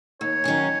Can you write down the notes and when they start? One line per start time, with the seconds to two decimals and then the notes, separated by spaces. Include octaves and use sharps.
0.21 D#2 C#5
0.44 D#3 F#3 C#4 G#4